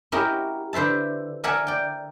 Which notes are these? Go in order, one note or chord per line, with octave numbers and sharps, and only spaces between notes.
C#4 E4 F#4 G4 A#4 D#5
D3 B4 C5 E5 A5
A#4 D5 E5 F#5 G#5 A5
D5 G5